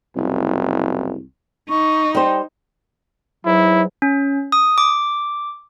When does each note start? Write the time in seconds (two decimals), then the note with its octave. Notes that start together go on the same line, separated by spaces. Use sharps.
0.16 F#1 C2
1.69 D#4 C#6
2.15 G3 C5 G5
3.46 G#2 E3 F#3 E4
4.02 C#4
4.52 D#6
4.78 D6